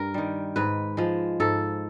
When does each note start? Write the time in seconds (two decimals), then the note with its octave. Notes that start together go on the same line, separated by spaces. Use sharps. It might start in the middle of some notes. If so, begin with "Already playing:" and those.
Already playing: G2 A#4
0.14 D#3 G3
0.56 G#2 B4
0.97 F3 G#3
1.40 G#2 A4